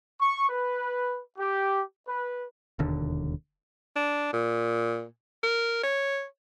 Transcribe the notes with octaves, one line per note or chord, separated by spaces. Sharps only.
C#6
B4
G4
B4
E1 D#2 D3
D4
A#2
A#4
C#5